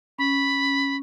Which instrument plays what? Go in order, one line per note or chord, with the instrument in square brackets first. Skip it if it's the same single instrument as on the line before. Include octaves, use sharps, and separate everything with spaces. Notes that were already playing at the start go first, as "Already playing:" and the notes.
[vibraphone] C#4 [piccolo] B5